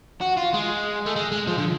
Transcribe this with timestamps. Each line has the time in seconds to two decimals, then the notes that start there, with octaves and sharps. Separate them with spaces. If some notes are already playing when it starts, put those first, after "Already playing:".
0.22 F#4
0.37 F4
0.54 G#3
1.06 A3
1.16 G#3
1.32 G#3
1.47 F3
1.58 D3